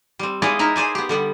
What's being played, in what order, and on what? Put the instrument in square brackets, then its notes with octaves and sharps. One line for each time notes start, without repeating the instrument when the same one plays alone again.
[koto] G3 C4
G#3 B3 E4 D5 D#5 F5
D#4 E4 A#4
G#4 C5 D5 G#5
B3 G4
D3 G3 B3